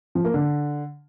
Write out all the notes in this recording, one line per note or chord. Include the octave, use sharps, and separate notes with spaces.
F3
A#3
D3